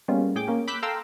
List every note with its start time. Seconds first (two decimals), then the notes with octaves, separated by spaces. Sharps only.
0.08 G3 G#3 A#3 B3 C#4 F4
0.35 A2 G#4 G5 D6
0.48 A#3 C#4
0.68 B5 D6 E6 F#6 G6 B6
0.83 A4 F5 G5 A#5 C6 E6